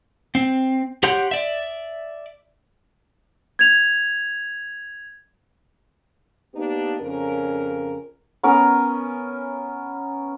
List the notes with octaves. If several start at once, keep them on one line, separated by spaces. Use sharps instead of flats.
C4
G4 C#5 F#5 C6 G6
D5 E5
G#6 F7
A#3 B3 D4 D#4 G4
F2 C#3 C#4 A#4
B3 C#4 A#4